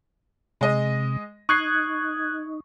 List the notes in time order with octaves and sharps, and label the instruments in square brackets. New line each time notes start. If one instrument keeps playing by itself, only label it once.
[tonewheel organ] C3 [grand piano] G#3 D#5
[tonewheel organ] D#4 [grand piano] C#6 C7 [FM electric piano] D#6 F#6 G#6